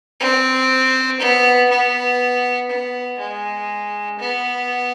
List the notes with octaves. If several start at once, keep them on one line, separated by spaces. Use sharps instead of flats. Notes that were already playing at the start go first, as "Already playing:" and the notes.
C4
B3
B3
B3
G#3
B3